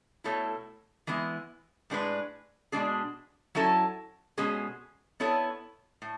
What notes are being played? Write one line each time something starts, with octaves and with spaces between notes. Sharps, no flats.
B2 A3 E4 A4 C#5
E3 G#3 B3 E4
A2 G#3 D4 G#4 B4
B2 G#3 D4 G#4
F#3 C#4 E4 A4
B2 G#3 C#4 G#4
B3 E4 A4 C#5
A2